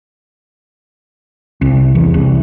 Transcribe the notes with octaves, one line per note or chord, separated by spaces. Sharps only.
C2
E2
C2